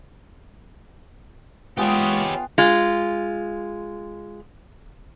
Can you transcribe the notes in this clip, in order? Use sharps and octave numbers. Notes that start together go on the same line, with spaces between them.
G#3 B3 F4 G4 G#4 C#5 G5
G#3 F4